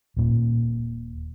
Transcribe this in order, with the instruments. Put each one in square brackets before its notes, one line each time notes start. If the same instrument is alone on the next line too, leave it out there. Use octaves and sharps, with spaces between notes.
[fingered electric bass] D#1 A#2